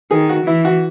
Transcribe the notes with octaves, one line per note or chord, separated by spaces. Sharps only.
D#3 G#4
F#4
E3 E4
F#4